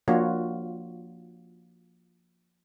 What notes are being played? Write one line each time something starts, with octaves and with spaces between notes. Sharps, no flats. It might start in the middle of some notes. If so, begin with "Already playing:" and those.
F3 A#3 D4 F4 F#4 C#5